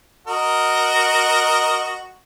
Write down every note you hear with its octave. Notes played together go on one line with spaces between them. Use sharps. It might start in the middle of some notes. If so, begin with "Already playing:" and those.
F#4 A#4 D#5